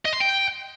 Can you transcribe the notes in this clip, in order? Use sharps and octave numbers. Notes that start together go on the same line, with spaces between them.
D#5
C6
G5